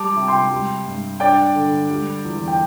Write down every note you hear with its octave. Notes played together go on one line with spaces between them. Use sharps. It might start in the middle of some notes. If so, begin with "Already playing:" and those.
Already playing: G3 A5 D6
C3
G5 C6
G3
G2
D4 D5 G5
D3
G3
E2
G5